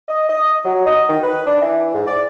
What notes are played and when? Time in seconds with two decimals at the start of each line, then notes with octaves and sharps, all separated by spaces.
0.08 D#5
0.29 D#5
0.65 F#3
0.86 D#5
1.09 D#3
1.23 B4
1.46 D4
1.61 E3
1.94 G#2
2.07 D5